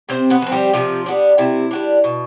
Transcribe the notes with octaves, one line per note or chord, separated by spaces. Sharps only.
C3 C4 C5
B3 B4
F3 C4
G3 G4
C3 F3 F4
G3 B3 D4
C3 E4
G3 B3 D4
B2